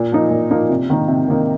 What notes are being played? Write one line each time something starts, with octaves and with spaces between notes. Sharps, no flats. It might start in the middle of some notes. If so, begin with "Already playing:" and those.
Already playing: A#2
F3 A#3 D#4
A#2
F3 A#3 D#4
C3
D#3 A#3 D#4
C3
D#3 A#3 D#4